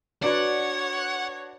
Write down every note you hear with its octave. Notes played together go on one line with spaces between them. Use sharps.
D4 F#4 B4 C#5 D5 F#5